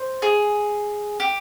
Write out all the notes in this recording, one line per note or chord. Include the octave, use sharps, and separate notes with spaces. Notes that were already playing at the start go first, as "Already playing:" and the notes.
Already playing: C5
G#4
G4